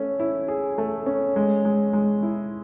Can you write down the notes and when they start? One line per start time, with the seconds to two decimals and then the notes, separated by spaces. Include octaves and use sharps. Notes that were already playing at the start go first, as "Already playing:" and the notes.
Already playing: A3 C#4
0.20 E4
0.48 G#4
0.78 A3
1.06 C#4
1.36 G#3
1.65 G#3
1.93 G#3
2.23 E4